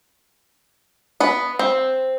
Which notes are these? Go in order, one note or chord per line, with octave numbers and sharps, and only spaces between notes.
B3 B4
C4